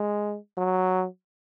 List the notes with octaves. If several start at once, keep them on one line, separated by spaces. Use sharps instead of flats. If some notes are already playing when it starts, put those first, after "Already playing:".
Already playing: G#3
F#3